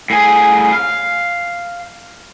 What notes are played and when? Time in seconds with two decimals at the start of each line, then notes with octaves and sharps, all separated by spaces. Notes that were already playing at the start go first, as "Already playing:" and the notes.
0.10 A2 G#4
0.73 F5